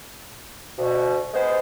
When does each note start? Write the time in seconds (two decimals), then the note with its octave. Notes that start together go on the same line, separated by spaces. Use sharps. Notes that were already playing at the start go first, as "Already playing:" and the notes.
0.78 D2 B2
1.33 G#3 B3 C5